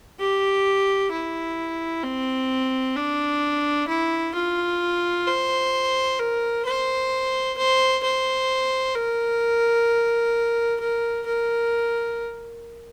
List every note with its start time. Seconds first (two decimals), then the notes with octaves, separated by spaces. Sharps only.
0.20 G4
1.12 E4
2.04 C4
2.96 D4
3.88 E4
4.34 F4
5.27 C5
6.19 A#4
6.66 C5
7.58 C5
8.03 C5
8.95 A#4
10.80 A#4
11.26 A#4